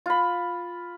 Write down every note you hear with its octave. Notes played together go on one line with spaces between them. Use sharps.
F4 B5